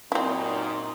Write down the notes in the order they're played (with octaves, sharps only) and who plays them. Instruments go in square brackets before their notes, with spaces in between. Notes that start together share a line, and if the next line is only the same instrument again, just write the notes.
[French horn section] F#2 A#2 [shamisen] C4 E4 [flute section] D#4 C6